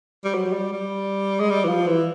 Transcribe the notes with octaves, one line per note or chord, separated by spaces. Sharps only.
G3
F#3
F#3
G3
G3
G#3
G3
E3
F3
E3